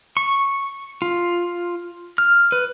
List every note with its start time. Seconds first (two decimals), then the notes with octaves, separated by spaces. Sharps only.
0.17 C#6
1.02 F4
2.18 F6
2.52 B4